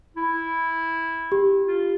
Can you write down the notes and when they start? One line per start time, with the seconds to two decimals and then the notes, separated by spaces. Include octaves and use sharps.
0.17 E4
1.32 G4
1.68 F4